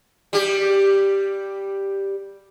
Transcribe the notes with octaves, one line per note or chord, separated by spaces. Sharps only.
G3 G4